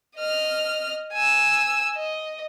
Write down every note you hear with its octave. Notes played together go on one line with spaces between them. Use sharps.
D#5 F6
G#5 E6
D#5